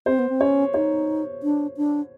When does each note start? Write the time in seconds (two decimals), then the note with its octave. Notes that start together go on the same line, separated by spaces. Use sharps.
0.06 C4 C5
0.19 B3
0.29 C4
0.41 C#4 C#5
0.74 D#4 C#5
1.43 D4
1.77 D4